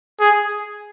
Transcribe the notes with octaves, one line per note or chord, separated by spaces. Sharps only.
G#4